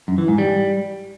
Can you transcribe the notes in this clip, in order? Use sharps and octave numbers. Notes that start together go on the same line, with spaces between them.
F#2
E3
G#2
G3